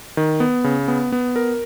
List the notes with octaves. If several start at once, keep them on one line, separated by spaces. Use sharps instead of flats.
D#3
B3
C#3
B3
B3
A#4